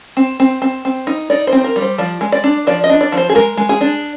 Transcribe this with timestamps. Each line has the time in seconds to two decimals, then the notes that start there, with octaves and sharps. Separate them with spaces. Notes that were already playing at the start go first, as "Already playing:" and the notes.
0.17 C4
0.40 C4
0.62 C4
0.85 C4
1.07 D#4
1.30 D#4 D5
1.47 C5
1.52 C4
1.58 C5
1.64 A#4
1.76 G3
1.82 C5
1.98 F3 D5
2.21 G#3
2.32 D5
2.44 D4
2.67 F3 D5
2.84 D#5
2.89 D4
3.01 D5
3.12 F3
3.17 C5
3.29 G#4
3.35 G#3 A#4
3.57 G#3
3.69 G#4
3.81 D4